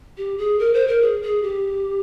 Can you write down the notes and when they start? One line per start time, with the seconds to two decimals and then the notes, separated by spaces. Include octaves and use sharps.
0.17 G4
0.38 G#4
0.59 A#4
0.74 C5
0.88 A#4
1.02 G#4
1.22 G#4
1.43 G4